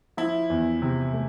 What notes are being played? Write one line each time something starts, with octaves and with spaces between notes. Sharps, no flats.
F3 E4
E2
C3
A3